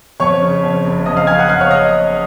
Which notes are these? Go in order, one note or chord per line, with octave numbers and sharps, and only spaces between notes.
F2 C#5 C#6
C#3
F2
F#1
F2 D#5 D#6
F5 F6
C#3 G#5 G#6
F#5 F#6
F#1 F5 F6
C#5 C#6
D#5 D#6